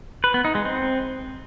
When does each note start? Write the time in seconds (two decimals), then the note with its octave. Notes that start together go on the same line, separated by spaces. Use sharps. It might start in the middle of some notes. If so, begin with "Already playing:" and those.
0.24 B4
0.34 B3
0.45 D#4
0.55 G#3
0.65 C4